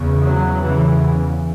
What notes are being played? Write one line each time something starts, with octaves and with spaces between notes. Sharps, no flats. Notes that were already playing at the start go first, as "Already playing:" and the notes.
Already playing: E2 C#3
F#3
E2 C#3 E3